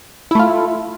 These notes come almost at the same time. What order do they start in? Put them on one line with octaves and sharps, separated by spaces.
E4 A3 F4